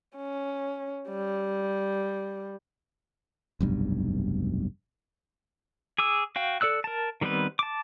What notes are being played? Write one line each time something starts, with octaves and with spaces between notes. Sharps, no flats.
C#4
G3
F1 B1 G2
G#4 D6 E6
F#4 F5 G5
A4 D5 E6 F#6
A#4 A5
D#3 G3 B3 C4 B4
A5 D6